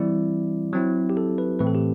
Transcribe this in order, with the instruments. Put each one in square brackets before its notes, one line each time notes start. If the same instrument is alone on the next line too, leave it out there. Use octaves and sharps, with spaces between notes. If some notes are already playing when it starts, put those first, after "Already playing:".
Already playing: [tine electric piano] E3 G3 C4 E4 D5
F#3 C4 E4
G4
A4
B4
A2 E3 A3 C4 B4
A4
G4